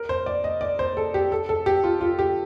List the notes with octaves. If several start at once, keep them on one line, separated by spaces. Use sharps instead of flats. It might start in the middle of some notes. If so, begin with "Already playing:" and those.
Already playing: A#4
C5
D5
D#5
D5
C5
A4
G4
A4
A4
G4
F4
F4
G4